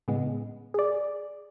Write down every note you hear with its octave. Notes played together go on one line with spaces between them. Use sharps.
A2 C#3 G#3 B3
G#4 D5